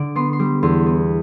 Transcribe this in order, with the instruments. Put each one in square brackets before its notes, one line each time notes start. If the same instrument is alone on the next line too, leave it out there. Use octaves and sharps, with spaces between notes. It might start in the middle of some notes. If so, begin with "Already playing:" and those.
Already playing: [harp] D3 D5
B3 C6
C6
G3 D6
E2 C6
B3